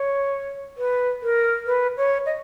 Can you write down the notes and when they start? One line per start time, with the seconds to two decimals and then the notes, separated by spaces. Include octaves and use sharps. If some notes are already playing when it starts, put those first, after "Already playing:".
Already playing: C#5
0.77 B4
1.22 A#4
1.67 B4
1.97 C#5
2.26 D#5